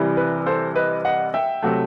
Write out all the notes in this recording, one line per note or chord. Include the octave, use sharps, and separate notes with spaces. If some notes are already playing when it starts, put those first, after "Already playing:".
Already playing: C2 C3 E3 G3
B4
A4 C5
B4 D#5
D#5 F#5
E5 G5
C3 F#3 A3